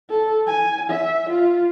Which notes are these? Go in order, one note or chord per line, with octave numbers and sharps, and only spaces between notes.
A4
G#5
E5
F4